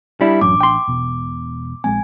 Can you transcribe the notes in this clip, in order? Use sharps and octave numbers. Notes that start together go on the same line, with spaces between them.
G3 D4 E4
A1 F#2 D4 D6
G5 C6
E1 B2
A#1 G#3 C4 G#5